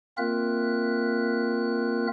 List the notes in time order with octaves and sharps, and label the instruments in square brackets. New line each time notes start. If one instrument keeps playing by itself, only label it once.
[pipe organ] A#3 C4 F4 A#4 E5 F#6